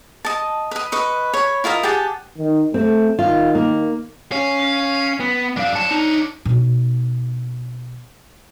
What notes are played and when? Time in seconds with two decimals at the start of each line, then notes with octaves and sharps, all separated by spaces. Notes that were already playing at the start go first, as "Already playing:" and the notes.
0.25 D#5 A5
0.71 B4 D#5
0.92 B4 D#5 C#6
1.34 C#5 B5
1.64 E4 F4 A#4 D#5
1.83 G4 G#4 F#5 A5
2.38 D#3
2.74 A3 C4
3.19 D#3 F4
3.55 A#3
4.32 C#4 C#5 F5
5.20 B3
5.57 F#2 D4 F5
5.75 D4 C#5 A5
5.91 D#4
6.45 B2 D#4